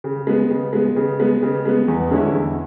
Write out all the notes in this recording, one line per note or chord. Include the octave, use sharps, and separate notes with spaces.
C#3
G#3 B3
C#3
G#3 B3
C#3
G#3 B3
C#3
G#3 B3
E2
D3 G#3 C#4 E4
E2